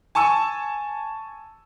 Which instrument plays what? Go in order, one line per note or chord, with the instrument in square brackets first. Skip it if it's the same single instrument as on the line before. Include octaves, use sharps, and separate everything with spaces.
[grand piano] G#5 A5 C#6 E6